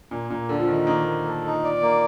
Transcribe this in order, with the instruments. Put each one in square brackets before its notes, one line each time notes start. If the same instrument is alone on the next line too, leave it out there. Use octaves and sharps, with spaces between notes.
[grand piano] A#2 [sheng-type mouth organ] A#3
[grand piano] A#2 [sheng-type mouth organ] A#3
[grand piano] D3 [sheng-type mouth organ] A4
[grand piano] F3
[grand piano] D#3 [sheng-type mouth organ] D#4
[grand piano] D#3 [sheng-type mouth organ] A#3
[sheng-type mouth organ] A#3
A4
D#4
D5
A#3